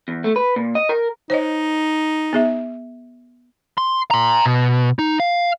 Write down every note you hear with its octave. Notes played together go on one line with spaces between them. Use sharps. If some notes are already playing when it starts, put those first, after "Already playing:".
E2
A3
B4
A#2
D#5
A#4
D#4 C5 C#5 D#5
B3 G#4 E5
C6
A#5 C6
B2
D#4
F5